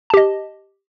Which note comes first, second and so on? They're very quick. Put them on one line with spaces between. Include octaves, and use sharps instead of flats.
A5 G4 D#5